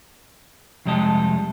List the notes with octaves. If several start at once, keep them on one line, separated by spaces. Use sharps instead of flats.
F2 C3 G3 G#3 D#5 A5